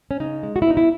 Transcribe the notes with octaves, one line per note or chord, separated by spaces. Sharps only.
C#4
C#3 D#4
G#3
F#4
E4
B3 D#4
E4